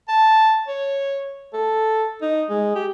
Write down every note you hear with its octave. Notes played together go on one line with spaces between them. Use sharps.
A5
C#5
A4
D#4
G#3
G4